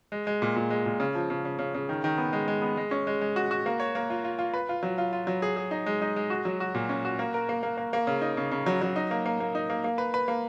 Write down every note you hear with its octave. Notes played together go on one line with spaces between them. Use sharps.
G#3
G#3
A#2
A#2
G#3
A#2
C#3
F3
C#3
C#3
C#3
C#3
D#3
D#3
B3
G#3
G#3
B3
G#3
C#4
G#3
G#3
F#4
F#4
A#3
C#5
A#3
F4
F4
F4
B4
F4
F#3
F4
F4
F#3
G#4
G#4
D#4
G#3
D#4
G#3
F#4
F#3
F#4
A#2
C#4
F#4
A#3
A#4
A#3
A#3
A#3
A#3
C#3
D#4
C#3
C#3
F#3
F#3
D#4
A#3
A#3
A#3
D#4
A#3
A#3
B4
B4
A#3